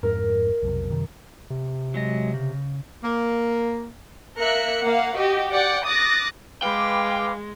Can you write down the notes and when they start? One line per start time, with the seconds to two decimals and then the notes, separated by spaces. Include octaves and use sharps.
0.03 F2 G#2 A#4
0.63 B1 F2 C3
0.90 F#2 C3 D#3
1.50 C3
1.94 F#3 G#3 D#5
2.34 C#3
3.04 A#3
4.39 A#3 A#4 E5 F#6 C#7
4.83 A#3 F5 F#5
5.15 F#4 G4 D#5
5.51 D5 F#5 G5
5.88 D6 D#6 F#6 A6 A#6
6.62 G#3 B4 F5 G5 D6